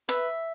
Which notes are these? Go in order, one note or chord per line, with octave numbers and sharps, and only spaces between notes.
B4 E5